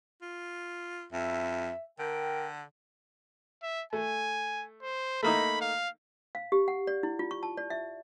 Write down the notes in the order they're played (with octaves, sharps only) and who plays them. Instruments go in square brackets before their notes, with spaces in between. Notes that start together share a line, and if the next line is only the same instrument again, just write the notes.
[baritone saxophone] F4
[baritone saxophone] F2 [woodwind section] E5
[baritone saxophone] D3 [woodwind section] A#4 G5
[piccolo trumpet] E5
[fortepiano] A3 [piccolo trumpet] G#5
[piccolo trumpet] C5
[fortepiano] A3 A#3 D#4 [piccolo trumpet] B5
[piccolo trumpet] F5
[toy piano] F5
G4
F#5
D5
E4
F4
C#6
A5
D5
E5